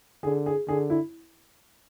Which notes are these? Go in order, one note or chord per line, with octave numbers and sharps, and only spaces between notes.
D3 G#4
G#4
D3 G#4
E4